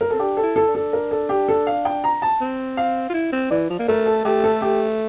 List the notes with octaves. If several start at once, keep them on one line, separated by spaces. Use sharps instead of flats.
A#4
C4 A4
D4 G4
A4
E4
A4
D4
A4
A#4
A4
G4
A4
F5
G5
A#5
A5
C4
F5
F4
E4
C4
E3 D5
F3
A#3
A3 A#4
A4
A3 G4
A4
G4